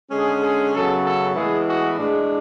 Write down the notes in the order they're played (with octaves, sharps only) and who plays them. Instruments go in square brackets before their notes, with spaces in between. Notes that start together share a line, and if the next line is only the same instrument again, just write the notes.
[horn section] D3 G#3 C#4 G#4
G#4
F#2 C#3 F#3 B3 A4
A4
A2 E3 G#3 B3 G#4
F#4
A2 G#3 D4